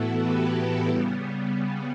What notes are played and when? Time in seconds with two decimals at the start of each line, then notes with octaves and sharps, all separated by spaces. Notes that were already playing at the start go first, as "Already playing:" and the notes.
Already playing: A2 E3 B3 E4 F#4 A4
0.22 G4 B4
0.88 C#3 G3 B3